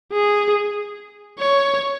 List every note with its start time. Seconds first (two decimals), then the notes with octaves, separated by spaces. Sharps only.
0.12 G#4
1.38 C#5